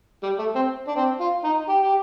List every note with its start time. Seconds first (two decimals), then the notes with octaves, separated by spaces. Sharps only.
0.23 G3
0.39 A3
0.55 C4
0.88 D4
0.96 C4
1.20 F4
1.44 D#4
1.69 G4
1.83 G4